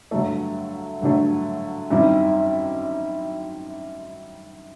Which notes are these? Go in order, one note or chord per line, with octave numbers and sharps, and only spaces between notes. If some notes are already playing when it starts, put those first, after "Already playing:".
G2 D3 F#3 A3
G2 D3 F#3 A3
F#2 D#3 G3 C4 E4